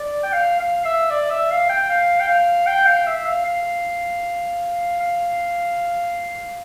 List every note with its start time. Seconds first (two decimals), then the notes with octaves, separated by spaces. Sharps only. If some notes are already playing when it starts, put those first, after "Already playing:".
Already playing: D5
0.23 G5
0.33 F5
0.60 F5
0.85 E5
1.11 D5
1.30 E5
1.51 F5
1.70 G5
1.90 F5
2.20 G5
2.28 F5
2.67 G5
2.86 F5
3.07 E5
3.25 F5
3.45 F5
5.01 F5